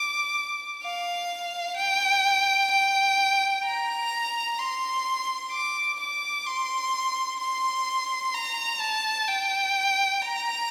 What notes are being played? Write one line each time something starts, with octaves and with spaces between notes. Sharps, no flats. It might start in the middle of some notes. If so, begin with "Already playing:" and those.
Already playing: D6
F5
G5
G5
A#5
C6
D6
D6
C6
C6
A#5
A5
G5
A#5